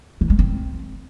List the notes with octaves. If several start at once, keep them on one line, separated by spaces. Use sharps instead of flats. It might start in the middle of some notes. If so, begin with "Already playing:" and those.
E3
G#3
C4